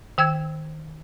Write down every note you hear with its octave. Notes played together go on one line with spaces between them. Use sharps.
D#3 G5 E6 G#6